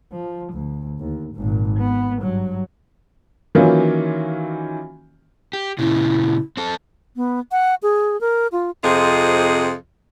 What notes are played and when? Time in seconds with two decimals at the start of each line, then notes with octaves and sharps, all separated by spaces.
0.11 F3
0.53 D2
0.99 D#2
1.35 G#1 A#2
1.78 B3
2.22 G2 F#3
3.55 D#3 E3 F#3 A#3 C#4 F4
5.53 G4
5.79 A#2 C#3 E4
6.57 C4 A4
7.16 B3
7.52 F#5
7.83 G#4
8.21 A#4
8.52 F4
8.84 F2 C3 F4 G#4 D#5